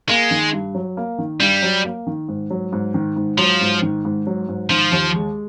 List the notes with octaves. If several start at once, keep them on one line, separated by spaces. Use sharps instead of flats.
G#3 A#3
D#3
G2
F#3
A#3
D#3
G2 G3
F#3
A#3
D#3
G#2
F#3
G#2
D#3
G#2
F3 F#3
G#2
D#3
G#2
F#3
G#2
D#3 F3
D#2
G#3